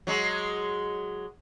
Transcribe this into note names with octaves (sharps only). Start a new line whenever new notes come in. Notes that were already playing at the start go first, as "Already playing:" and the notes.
F#3 G#3